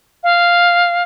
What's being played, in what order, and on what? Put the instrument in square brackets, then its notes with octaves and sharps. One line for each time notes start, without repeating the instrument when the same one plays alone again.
[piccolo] F5